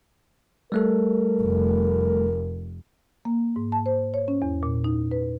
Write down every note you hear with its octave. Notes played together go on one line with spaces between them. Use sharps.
G3 A3 A4 A#4
F1
A#3
G#2
A5
C5
C#5
C#4
E2
A#2
D#4
B4